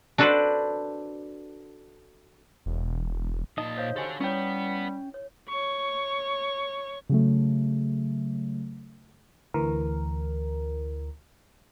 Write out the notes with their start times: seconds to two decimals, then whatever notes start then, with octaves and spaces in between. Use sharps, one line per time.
0.18 D4 F#4 A4 B4 C5 D5
2.66 E1
3.58 A#2 D#4 D#5 A5
3.77 C5 C#5 F5
3.96 F#4 G4 A4 F#5 G#5
4.21 G3 B3 C#4 E4 C#5 G5
5.14 C#5
5.49 C#5 C#6
7.09 C#3 F#3 A3
9.54 D2 E3 A#4